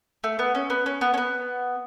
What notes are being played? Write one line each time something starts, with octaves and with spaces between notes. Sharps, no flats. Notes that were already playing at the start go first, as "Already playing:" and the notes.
A3
B3
C#4
B3
C#4
B3
C#4
B3